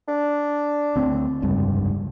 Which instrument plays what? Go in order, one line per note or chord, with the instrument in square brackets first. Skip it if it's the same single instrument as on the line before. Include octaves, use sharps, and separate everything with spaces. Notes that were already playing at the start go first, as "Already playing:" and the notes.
[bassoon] D4
[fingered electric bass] D2 C4
F1 C#2 G2